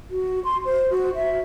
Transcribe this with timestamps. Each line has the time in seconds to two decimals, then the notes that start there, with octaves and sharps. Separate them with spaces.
0.11 F#4
0.44 C6
0.65 C5
0.90 F#4
1.15 E5